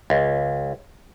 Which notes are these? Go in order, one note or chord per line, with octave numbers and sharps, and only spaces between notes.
C#2